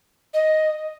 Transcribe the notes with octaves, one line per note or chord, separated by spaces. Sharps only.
D#5